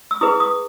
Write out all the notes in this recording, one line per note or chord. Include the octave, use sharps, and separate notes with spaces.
E6
E4 G#4 B4 D#6
D#6